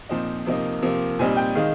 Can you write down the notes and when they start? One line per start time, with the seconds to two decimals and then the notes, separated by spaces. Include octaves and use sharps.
0.09 A#2 F3 C4 D#4
0.46 C3 F3 A#3 D#4
0.82 C3 F3 A#3
1.19 A#2 G3 C4 D#4 G#5
1.37 G5
1.55 D#3 G#3 D#4 F5